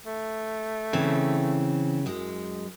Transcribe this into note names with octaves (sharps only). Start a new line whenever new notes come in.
A3
C#3 E3 C4
F#2 G#3